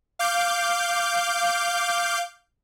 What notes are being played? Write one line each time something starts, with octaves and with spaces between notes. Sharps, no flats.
F5 D6 G6